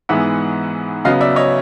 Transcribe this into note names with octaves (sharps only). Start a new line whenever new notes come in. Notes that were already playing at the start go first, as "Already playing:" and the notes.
G#2 E3 G#3 B3 E5 F#5
C#3 F#3 B3 D#5 F5
D5 E5
C#5 D#5